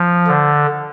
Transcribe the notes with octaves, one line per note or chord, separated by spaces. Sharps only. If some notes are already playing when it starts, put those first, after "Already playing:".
Already playing: F3
D3